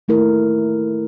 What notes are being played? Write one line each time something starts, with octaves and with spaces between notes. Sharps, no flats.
D#3 A3 E4 A#4